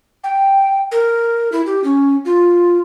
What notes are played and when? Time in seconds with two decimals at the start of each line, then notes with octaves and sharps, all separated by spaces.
0.24 G5
0.91 A#4
1.52 E4
1.66 G4
1.84 C#4
2.25 F4